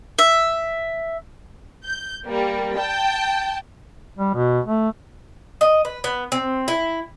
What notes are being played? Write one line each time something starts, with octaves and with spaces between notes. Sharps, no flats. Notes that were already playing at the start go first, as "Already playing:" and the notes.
E5
G6
G3 A#3
G5 A5 G6
G3
B2
A3
D#5
B4
B3
C4
E4